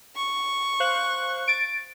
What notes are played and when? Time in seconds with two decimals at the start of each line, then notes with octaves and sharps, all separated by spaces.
0.16 C#6
0.80 C5 F5 F#6
1.48 A6 D7